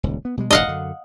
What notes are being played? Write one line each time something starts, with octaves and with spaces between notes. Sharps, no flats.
D#1 C#2
B3
B2 G3 G#3
E1 A1 F#2 D#5 F5 F#5
F#2 D3